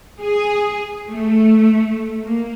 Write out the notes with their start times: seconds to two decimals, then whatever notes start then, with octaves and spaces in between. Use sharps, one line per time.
0.21 G#4
1.09 A3
2.24 A#3